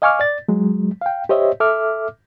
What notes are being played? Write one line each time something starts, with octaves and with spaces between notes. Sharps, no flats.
D#5 F5 G#5 C#6 D6 F6
D5 A6
F#3 G#3
F5 G5
G4 C5 C#5 D#5 E5
A4 E5 D6 F6